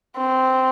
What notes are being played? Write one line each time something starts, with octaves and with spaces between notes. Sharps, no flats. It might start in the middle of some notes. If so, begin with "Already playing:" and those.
C4